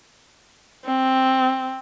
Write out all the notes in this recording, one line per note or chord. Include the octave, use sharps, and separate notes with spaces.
C4